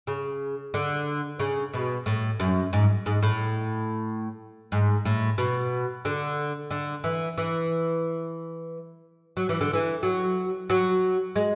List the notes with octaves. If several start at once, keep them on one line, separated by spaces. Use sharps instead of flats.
C#3
D3
C#3
B2
A2
F#2
G#2
G#2
A2
G#2
A2
B2
D3
D3
E3
E3
F#3
E3
D3
E3
F#3
F#3
G#3